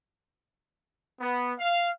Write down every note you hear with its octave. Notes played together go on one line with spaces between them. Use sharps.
B3
F5